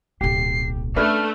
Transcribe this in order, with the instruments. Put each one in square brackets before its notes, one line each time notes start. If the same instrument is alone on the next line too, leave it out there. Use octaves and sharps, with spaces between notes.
[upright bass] D1 B1 [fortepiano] G4 [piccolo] C7
[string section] A3 [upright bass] C#4 [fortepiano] D4 B4 [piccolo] F6